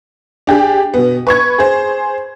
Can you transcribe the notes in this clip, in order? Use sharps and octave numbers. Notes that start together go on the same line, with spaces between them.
D4 G4 G#4
B2 B3
B4 C#6 G#6
G#4 C5